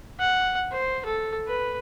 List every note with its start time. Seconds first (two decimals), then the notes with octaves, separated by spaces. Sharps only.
0.20 F#5
0.72 C5
1.05 A4
1.47 B4